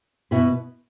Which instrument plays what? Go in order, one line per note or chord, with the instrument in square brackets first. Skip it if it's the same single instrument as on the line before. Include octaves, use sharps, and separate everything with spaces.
[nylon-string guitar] B2 B3 E4 B4